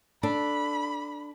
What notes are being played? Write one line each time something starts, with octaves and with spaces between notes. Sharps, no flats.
D4 A4 B5